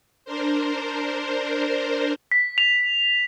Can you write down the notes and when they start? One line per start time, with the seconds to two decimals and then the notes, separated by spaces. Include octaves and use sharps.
0.25 D4 A#4 C5
2.32 B6
2.58 F7